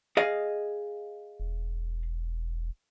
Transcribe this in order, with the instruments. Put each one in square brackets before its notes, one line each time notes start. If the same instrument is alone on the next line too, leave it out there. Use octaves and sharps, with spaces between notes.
[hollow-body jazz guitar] G#4 D#5 F5
[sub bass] E1